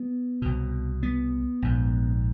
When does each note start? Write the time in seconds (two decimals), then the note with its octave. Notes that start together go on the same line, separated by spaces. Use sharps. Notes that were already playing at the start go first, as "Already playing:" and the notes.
Already playing: B3
0.42 C2 B2
1.03 B3
1.62 A#1 G#2